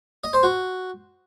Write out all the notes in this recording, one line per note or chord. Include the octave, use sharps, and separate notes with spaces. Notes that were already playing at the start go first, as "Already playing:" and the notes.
D#5
C5
F#4